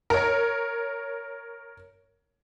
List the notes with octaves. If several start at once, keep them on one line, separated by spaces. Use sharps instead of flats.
A#4 C#5